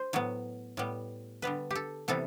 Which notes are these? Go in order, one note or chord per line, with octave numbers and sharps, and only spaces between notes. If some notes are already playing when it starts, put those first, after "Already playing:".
Already playing: C5
A2 F#3 B3
A2 G3 B3
D3 G3 B3 B4
G4 A4
C3 E3 G3 B3 A4